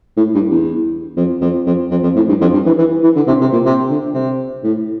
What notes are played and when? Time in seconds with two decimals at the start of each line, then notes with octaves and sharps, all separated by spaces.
0.17 A2
0.34 G2
0.51 E2
1.17 F2
1.41 F2
1.67 F2
1.91 F2
2.03 F2
2.16 A2
2.29 G2
2.41 F2
2.53 G2
2.66 E3
2.78 E3
3.04 E3
3.16 D3
3.27 C3
3.41 C3
3.52 A#2
3.65 C3
3.90 D3
4.14 C3
4.64 A2